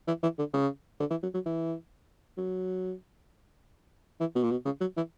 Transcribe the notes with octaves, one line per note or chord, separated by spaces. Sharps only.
E3
E3
D3
C#3
D3
E3
F#3
F#3
E3
F#3
E3
B2
A#2
B2
C#3
F#3
E3